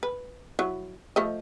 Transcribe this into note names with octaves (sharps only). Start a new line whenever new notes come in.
B4
F#3 E4
F3 A3 D#5